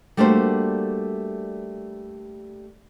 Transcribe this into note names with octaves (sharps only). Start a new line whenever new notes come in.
G3 A3 A#3 D4 F#4 C5